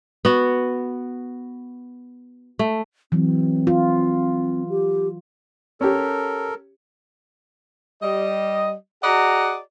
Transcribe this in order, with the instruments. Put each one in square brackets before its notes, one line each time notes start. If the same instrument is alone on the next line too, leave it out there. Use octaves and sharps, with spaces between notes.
[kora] B3 F#4
A3
[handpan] E3 F#3 [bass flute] C4
[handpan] F4
[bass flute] G4
[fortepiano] C#4 G4 [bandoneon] A4 A#4
[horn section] G3 D#5
F#4 G#4 D5 D#5 F#5 A#5